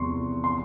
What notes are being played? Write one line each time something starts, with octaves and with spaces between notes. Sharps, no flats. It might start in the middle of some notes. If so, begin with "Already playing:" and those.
Already playing: E2 C3 F3 G#3 C6 C#6
C6